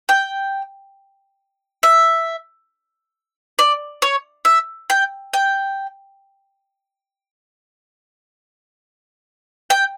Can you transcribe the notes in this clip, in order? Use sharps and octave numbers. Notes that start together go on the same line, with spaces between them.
G5
E5
D5
C#5
E5
G5
G5
G5